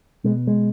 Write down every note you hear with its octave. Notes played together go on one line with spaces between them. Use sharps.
B2 G#3
G#3